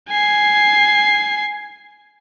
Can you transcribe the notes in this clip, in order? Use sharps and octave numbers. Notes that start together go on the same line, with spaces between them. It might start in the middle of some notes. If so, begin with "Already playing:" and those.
G#5 C7